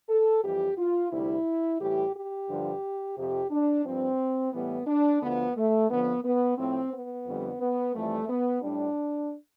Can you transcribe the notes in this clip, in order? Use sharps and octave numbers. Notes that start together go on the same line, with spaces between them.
A4
F2 E3 G3 G4
F4
D2 C3 G3 E4
A2 E3 G3 G4
G4
G2 D3 F3
F2 C3 F3 G4
D4
G2 F3 C4
A2 E3 G3 B3
D4
D2 D3 F3 B3
A3
F2 D3 F3 B3
B3
A2 F3 C4
B3
F2 D3 G3
B3
F2 E3 G3 A3
B3
A2 G3 D4